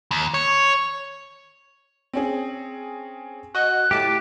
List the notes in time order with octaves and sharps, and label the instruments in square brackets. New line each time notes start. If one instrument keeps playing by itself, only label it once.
[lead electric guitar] D#2
C#5
[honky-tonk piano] C4 C#4 G#4
[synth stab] F#4 D#5 [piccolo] F#6
[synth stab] A2 A5 D6 [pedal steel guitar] G4